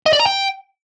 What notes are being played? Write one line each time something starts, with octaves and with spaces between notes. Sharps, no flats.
D#5
D5
A#5
G5